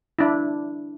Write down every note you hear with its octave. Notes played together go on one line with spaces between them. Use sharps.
D4 E4